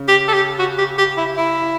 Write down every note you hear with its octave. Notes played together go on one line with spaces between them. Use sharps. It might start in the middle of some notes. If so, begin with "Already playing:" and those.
Already playing: C#3
G4
A4
G4
F#4
G4
G4
E4
E4